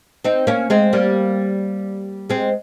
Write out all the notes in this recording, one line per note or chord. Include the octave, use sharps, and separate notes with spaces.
C4 D#4
A#3 C#4
G#3 C4
G3 A#3
G#3 C4